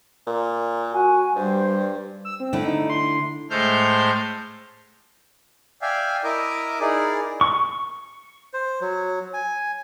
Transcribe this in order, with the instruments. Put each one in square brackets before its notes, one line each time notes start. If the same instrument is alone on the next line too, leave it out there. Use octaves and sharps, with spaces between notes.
[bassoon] A#2
[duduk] F#4 [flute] G#5
[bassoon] G2 [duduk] G3 [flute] C5
[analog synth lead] E6
C4
[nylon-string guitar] D3 A3 E4
[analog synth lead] D#4
C6
[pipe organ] A2 G#3 A3 C5 F6 G6
[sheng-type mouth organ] D5 E5 F5 G5 G#5
E4 A#4 D#5 E5 D6
D#4 E4 G#4 A#4 D5
[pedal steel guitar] C#6
[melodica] C5
F#3
G#5